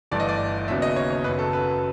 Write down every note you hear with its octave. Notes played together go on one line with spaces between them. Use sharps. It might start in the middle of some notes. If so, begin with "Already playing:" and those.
G1 G2 E3 A3 D5
D#5
D5
D#2 C#3 F#3 B3 E5
D#5
C#5
C#5
F#2 C#3 F#3 B4
A4
B4